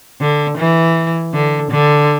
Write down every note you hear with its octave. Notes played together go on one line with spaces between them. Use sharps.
D3
E3
D3
D3